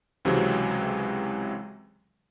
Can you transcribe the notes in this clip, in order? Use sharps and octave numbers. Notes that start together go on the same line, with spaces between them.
C#2 C3 E3 F#3 G#3 C4